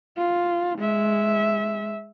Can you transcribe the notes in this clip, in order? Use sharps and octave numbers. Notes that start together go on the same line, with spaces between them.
F4
G#3 E5